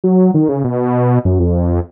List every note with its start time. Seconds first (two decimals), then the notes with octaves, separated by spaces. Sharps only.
0.04 F#3
0.34 D#3
0.49 C#3
0.64 B2
1.25 F#2
1.39 F2